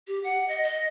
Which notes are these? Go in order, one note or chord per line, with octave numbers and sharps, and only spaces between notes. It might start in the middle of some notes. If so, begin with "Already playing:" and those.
G4
F#5
D#5
D#5